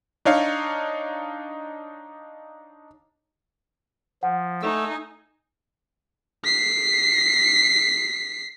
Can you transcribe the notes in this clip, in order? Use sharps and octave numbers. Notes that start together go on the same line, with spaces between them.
D4 D#4 C#5 F5
F3 F#5
A3 D#4 G#5 E6
B6 C7